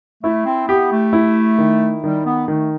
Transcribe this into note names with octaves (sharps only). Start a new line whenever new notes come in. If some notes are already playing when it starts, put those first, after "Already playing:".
A3 E4
C4
B3 G4
A3
E4
D#3
D#3 G3
B3
D#3 A3